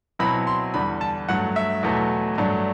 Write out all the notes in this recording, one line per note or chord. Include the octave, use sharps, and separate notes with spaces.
B2 F#3 C4 E4 B5
C6
E2 D3 G3 B5
A5
G2 F#3 A3 F#5
E5
E2 B2 F#3 A3
G2 F#3 A3 D4